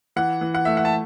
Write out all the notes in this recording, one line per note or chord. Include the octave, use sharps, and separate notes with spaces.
E3 F#5
E3
F#5
A3 E5
F#5
A5